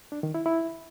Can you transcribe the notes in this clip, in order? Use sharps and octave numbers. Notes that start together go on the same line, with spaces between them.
D4
D#3
E4
E4